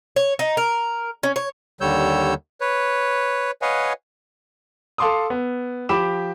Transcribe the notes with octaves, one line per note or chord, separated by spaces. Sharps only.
C#5
D#4
A#4
C#4
C#5
D#2 D3 G3 C#5 E6 G6
B4 C#5
B4 C#5 D#5 F5 F#5 G#5
A4 F5 A5 C6 D6 D#6
B3
F3 G4 B5 D6 E7